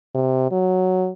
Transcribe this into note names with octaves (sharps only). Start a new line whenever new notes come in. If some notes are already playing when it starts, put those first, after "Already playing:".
C3
F#3